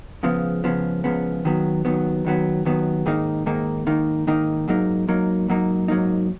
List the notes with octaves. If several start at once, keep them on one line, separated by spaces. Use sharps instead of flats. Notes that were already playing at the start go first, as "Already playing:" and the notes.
C#2 C#3 F3 B3
C#2 C#3 F3 B3
C#2 C#3 F3 B3
D#2 D#3 F#3 B3
D#2 D#3 F#3 B3
D#2 D#3 F#3 B3
D#2 D#3 F#3 B3
G#2 D#3 A#3 D#4
G#2 D#3 A#3 D#4
G#2 D#3 A#3 D#4
G#2 D#3 A#3 D#4
G#2 F#3 A#3 D#4
G#2 F#3 A#3 D#4
G#2 F#3 A#3 D#4
G#2 F#3 A#3 D#4